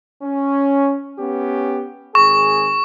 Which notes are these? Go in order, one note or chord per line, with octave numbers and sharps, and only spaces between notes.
C#4
B3 C#4 G4
G#1 G#4 C#6